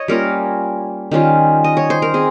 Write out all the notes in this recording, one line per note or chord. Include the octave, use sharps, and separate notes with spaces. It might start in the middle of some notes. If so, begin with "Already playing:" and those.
Already playing: C#5 D#5
G3 A#3 C#4 F4 A#4
D#3 G3 C#4 F4
D#5
C#5
C5
A#4
C4 G#4